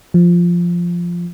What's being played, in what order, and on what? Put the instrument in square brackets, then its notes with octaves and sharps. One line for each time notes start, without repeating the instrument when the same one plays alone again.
[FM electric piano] F3